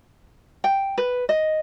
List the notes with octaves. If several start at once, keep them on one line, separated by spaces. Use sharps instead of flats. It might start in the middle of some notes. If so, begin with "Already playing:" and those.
G5
B4
D#5